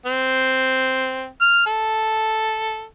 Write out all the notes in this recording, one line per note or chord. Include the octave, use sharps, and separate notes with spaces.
C4
F6
A4